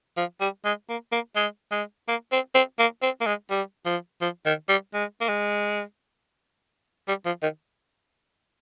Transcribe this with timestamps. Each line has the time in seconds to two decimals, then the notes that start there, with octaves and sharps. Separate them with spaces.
0.17 F3
0.41 G3
0.65 G#3
0.89 A#3
1.12 A#3
1.36 G#3
1.72 G#3
2.08 A#3
2.32 C4
2.55 C4
2.79 A#3
3.02 C4
3.21 A#3
3.26 G#3
3.50 G3
3.86 F3
4.21 F3
4.46 D#3
4.69 G3
4.93 G#3
5.21 A#3
5.28 G#3
7.08 G3
7.26 F3
7.42 D#3